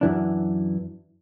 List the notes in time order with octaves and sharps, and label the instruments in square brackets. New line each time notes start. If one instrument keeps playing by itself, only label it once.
[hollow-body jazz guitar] F#2 E3 D4